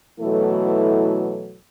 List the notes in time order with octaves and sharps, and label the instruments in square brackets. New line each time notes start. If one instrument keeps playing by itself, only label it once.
[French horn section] B2 E3 F#3 A3 E4 A4